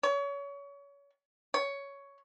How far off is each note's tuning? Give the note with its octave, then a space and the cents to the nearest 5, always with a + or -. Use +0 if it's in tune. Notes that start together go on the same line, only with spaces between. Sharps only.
C#5 +30
C#5 +10